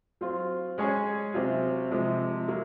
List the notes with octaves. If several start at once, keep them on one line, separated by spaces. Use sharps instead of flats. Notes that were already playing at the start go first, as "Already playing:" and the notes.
F#3 C4 F4
G#3 C#4 G#4 C#5
C3 F#3 C4 F4
C3 F3 G#3
F#3 A#3